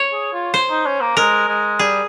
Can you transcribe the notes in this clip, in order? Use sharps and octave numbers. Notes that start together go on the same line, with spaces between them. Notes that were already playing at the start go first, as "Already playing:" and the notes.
Already playing: C#5
G#4
F4
C5
D#4
C#4
A#3
G#3 A#4
G#3
G3 G#4